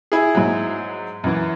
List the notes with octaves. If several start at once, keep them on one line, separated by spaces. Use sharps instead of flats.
E4 G#4
G#2 F#3
F#2 E3